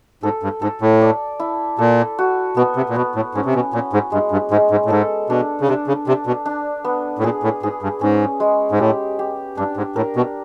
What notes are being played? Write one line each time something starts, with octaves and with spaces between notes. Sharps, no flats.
G#2 A4
G2
G#2 A4
A2
D5
E4
A#2 A4
F#4
B2 B3
C3
A#2
B2 B3
A2
G#2 C#4
C3
B2
A#2 C#4
G#2
G2 G#3
G2
G#2 G#3
G#2
A2
G#2 A4
B2 D4
C#3
C3 D4
C#3
C3 D4
B2
D4
B3
A2
A#2 G#4
A2
G#2 G#4
G2
G#2 C#4
G#3
G#2
A2 G4
G4
G2 D4
G#2
A2 A#4
B2